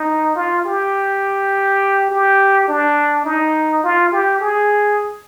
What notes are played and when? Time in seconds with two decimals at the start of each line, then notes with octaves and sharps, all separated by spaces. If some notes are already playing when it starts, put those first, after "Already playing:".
Already playing: D#4
0.36 F4
0.65 G4
2.10 G4
2.68 D4
3.25 D#4
3.84 F4
4.12 G4
4.41 G#4